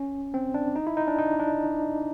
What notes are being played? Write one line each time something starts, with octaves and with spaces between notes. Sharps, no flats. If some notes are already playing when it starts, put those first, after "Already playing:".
Already playing: C#4
C4
D4
D#4
E4
D#4
D4
D#4
D4